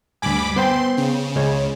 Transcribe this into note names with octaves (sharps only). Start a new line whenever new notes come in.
D2 G2 G#5 B5 D6
B3 C5 G5 C6
C#3
C#2 G#3 C#5